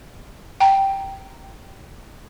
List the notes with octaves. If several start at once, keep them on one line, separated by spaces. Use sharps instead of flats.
G5 A#5